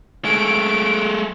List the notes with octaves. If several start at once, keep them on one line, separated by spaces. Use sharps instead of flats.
G#3 A3 D7